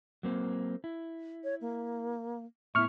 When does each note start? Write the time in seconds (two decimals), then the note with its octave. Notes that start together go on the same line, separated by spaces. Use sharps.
0.23 F#3 A#3 C4
0.84 E4
1.44 C#5
1.61 A#3
2.75 A2 B3 E4 E5 C#6 F6